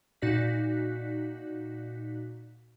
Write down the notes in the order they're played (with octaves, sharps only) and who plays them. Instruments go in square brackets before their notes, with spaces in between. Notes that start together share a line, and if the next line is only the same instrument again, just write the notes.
[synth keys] A#2 D#4 F#4 D5 F#6 B6